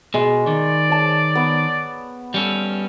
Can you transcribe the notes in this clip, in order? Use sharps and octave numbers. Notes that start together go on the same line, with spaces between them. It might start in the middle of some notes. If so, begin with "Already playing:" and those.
B2 G#3
D#3 D5
C#5 A5
B3
G3 C#4 A4